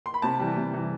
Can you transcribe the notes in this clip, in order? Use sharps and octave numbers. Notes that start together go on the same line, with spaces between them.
C6
B5
C3 A5
E3 G3
C3
E3 G3